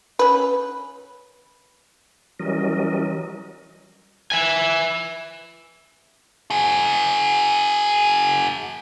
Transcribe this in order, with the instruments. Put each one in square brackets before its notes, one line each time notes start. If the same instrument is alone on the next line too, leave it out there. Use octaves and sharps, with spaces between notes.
[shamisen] C#4 B4
[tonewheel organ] E3 F#3 G3 C#4 A#4 D#5
[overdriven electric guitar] E5 G#5
[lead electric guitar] F#4 G#4